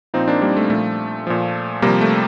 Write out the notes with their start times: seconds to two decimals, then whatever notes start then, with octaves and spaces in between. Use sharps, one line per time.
0.14 A#2 F3 C4 D#4
0.28 A#3 D4
0.41 G3 A#3
0.57 A3
0.70 A#2 F3 A3
1.27 A#2 F3
1.82 C3 F3 G3 A#3
2.01 A3